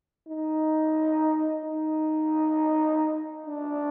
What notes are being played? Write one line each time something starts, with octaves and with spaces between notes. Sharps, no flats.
D#4
D#4
D4